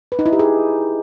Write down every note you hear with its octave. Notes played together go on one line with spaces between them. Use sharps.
B4
D#4
E4
G4
G#4